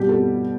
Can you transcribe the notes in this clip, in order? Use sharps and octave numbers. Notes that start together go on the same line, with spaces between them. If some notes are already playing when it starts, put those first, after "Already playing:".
Already playing: B2 G3 G4
A4